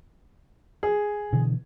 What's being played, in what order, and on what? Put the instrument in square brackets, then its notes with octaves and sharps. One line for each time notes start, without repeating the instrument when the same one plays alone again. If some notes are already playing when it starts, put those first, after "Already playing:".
[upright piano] G#4
[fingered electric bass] B2 D3 E3